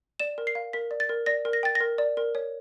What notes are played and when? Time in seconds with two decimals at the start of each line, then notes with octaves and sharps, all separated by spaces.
0.20 D5 E7
0.38 A#4
0.47 C7
0.55 F5
0.73 A#4 B6
0.91 D5
1.00 A6
1.09 A#4
1.26 D5 A#6
1.45 A#4
1.53 A#6
1.63 G5 A6
1.75 A#6
1.81 A#4
1.98 D5
2.17 A#4
2.35 C#5